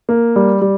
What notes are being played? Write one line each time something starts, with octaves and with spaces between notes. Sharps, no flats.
A#3
G3
G3